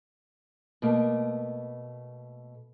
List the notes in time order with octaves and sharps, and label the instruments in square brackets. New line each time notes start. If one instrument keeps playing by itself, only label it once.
[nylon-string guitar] B2 A3 A#3